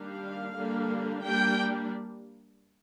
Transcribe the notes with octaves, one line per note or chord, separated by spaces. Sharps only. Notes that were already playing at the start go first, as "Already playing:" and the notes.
Already playing: D#3 G3 A#3 D4 F5
D3 G3 A#3 D4
G3 A#3 D4 G5